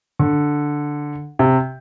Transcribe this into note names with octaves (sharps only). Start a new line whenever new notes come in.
D3
C3